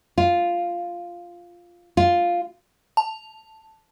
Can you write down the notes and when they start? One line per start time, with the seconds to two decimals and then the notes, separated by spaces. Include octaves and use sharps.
0.18 F4
1.97 F4
2.97 A5